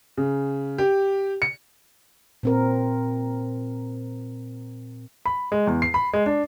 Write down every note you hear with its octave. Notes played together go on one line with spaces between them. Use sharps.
C#3
G4
C#7
A#2 C4 A#4
B5
G#3
E2
C7
B5
G#3
D4